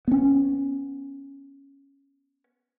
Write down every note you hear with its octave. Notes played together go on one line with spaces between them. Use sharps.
B3 C#4